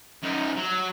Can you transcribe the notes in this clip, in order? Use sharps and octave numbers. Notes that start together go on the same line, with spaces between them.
F#2 D#4
F#3